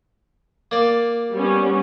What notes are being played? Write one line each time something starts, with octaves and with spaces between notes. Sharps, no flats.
A#3 D5
G3 B3 C#4